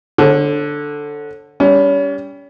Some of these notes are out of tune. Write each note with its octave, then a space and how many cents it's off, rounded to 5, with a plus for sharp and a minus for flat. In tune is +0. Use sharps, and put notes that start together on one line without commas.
D3 +5 C#5 -35
G3 +10 C#4 +35